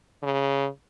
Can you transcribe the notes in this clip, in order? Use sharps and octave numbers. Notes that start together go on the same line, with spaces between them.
C#3